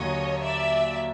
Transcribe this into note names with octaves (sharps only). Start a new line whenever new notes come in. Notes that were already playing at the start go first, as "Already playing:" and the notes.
Already playing: D#2 D3 F#3 C#5 D#5
D5 E5